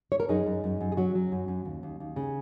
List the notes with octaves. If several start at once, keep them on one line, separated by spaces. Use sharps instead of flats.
C#5
A#4
F#2 D#4 G#4
F#2
F#2
F#2
G#4
F#3 C#4 F#4
F#3
F#2
F#2
D#2
D#2
D#2
C#3